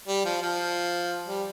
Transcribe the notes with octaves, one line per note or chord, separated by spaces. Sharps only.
G3
F3
F3
G3